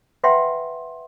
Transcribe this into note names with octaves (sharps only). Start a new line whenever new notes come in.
B4 E5 F#5 G5 B5 C6